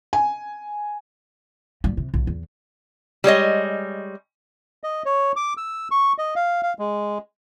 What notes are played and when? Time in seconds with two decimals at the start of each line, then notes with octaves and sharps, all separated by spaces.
0.13 G#5
1.84 G2
1.97 C3
2.14 B1
2.27 E2
3.24 G3 G#3 C#5 D#5
4.84 D#5
5.05 C#5
5.36 D6
5.57 E6
5.91 C#6
6.18 D#5
6.36 F5
6.63 F5
6.79 G#3